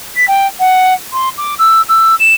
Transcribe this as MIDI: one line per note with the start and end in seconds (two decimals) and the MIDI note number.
0.16 0.25 95
0.28 0.47 79
0.59 0.93 78
1.12 1.29 84
1.37 1.54 86
1.58 1.81 88
1.88 2.14 88
2.19 2.34 100